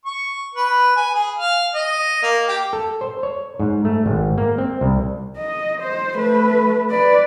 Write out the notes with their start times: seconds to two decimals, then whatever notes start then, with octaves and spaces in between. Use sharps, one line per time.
0.06 C#6
0.54 B4
0.96 G#5
1.14 G#4
1.36 F5
1.74 D#5
2.23 A#3
2.48 G4
2.73 A4
3.01 C5
3.23 C#5
3.59 G#2
3.85 A3
4.06 G#1
4.38 A#3
4.58 C4
4.81 C2
5.37 D#5
5.81 C5
6.17 A3 B4
6.91 B4 D5